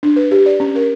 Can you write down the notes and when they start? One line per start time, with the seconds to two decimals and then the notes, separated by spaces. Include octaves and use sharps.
0.03 D4
0.16 B4
0.31 G4
0.46 D5
0.60 C#4
0.75 A#4